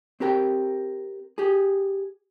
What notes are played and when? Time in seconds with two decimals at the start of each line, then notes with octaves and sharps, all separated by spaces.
0.20 C4 G4 A#4 G5
1.38 G4 G#4